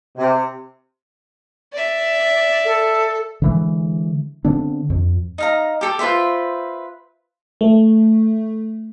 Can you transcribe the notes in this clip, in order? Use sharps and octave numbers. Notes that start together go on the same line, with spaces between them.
C3
D5 E5
A4
D3 E3 G#3
D3 B3 C4 D4
F2
D#4 F5 A#5
G4 A4 G5
F4 B4 C5 E5
A3